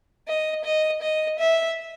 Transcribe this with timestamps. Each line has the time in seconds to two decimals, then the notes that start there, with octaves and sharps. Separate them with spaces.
0.28 D#5
0.65 D#5
1.02 D#5
1.39 E5